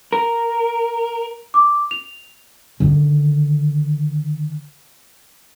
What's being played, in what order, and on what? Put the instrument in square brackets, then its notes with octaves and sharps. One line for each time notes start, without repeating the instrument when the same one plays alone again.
[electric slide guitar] A#4
[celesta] D6
F7
[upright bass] D3 D#3